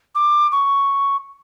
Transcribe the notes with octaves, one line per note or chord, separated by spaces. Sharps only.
D6
C#6